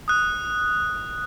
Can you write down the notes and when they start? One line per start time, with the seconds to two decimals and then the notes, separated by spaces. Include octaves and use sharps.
0.08 D#6 F#6